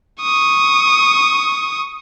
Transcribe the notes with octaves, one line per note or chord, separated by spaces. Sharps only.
C#6 D#6